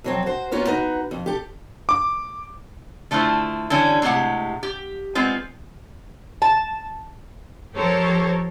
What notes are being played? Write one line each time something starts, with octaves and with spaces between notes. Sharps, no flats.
F2 F#3 C4
F#4 C5
A#3 B3 C#4 F4 F#4
D#4 F#4 B4
F2
G4 A4
D6
D3 A3 E4 F4 C5
D3 E3 G3 C#4
A2 C3 D#3 G#3 G4 F#5
G4
G#3 B3 C4 F4
A5
F3 G4 A4 A#4 C5 C#5